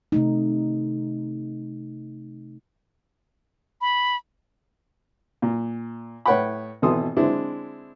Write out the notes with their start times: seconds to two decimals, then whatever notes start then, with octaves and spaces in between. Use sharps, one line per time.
0.12 C3 A3 D#4
3.81 B5
5.42 A#2
6.26 A2 B4 C#5 F#5 G5 B5
6.82 G#1 B2 E3 A4 C6 D#6
7.17 D3 G#3 C4 D4 E4